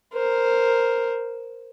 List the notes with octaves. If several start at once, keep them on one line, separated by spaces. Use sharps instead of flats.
A#4 C5